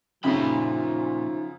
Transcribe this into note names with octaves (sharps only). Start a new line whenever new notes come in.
F#2 A#2 C#3 F3 D#4 E5 G5 B5